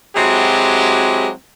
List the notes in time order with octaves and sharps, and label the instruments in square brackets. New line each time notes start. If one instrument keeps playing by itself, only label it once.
[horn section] F#3 G#3 C4 E4 F#4 G4